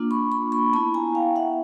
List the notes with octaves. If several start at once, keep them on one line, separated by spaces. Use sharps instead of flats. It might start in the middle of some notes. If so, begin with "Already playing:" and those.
Already playing: A#3 D4 F4
B5 C#6
B5 C#6
B5 C#6
B3 E4 A5 B5
G#5 A#5
F5 G5
E5 F#5